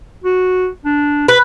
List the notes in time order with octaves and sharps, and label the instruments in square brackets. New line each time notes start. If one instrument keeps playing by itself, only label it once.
[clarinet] F#4
D4
[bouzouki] B4 [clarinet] B5